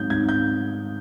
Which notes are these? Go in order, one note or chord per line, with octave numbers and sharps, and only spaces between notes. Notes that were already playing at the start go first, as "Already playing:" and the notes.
Already playing: G#2 F#3 G6
G#2 G#6
G6